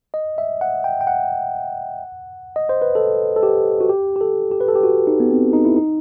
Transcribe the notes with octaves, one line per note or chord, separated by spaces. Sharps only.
D#5
E5
F#5
G5
G5
F#5
D#5
C5
B4
A4
A4
G4
F#4
G4
G4
A4
G4
B4
A4
G4
F#4
D#4
B3
C4
D#4
E4
D#4